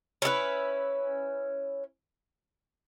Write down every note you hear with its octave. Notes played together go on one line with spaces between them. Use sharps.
C#4 E4 A4 B4